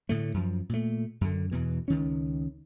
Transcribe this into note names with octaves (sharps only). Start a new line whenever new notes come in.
A2 D3 A3
F#2 F3
A#2 A3
F#2 D3
E2 B2 E3
C#2 D#3 C#4